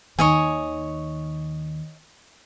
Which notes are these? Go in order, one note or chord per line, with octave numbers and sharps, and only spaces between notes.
D#2 D#3 C#5 D#5 G#5